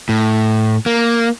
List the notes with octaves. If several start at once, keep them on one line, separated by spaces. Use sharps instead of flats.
A2
A#3